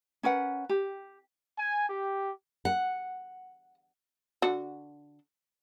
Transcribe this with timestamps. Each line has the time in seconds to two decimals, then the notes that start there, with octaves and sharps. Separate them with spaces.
0.23 C#4 A#4 B4 F#5
0.69 G4
1.57 G#5
1.90 G4
2.65 F#5
4.42 D3 F#4